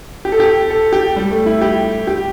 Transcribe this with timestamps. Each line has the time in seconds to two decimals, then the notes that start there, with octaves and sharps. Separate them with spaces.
0.25 G4
0.32 A4
0.40 G4
0.70 A4
0.93 G4
1.16 G3
1.31 A3
1.46 E4
1.61 G4
2.07 G4